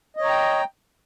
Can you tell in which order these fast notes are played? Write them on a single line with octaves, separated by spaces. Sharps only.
D#5 C#5 A#5 G5